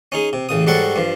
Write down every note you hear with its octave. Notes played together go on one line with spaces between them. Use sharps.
C#4 D#4 G#4
C3
A1 C#3 D#6
G#2 F#3 G3 A4 F#5 C#6
G2 F3